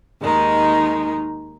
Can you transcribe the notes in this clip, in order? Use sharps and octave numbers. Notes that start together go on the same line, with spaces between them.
D#2 D#3 G#3 D#4